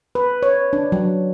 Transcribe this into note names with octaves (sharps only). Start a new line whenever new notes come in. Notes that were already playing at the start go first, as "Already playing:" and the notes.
B4
C#5
D4
F#3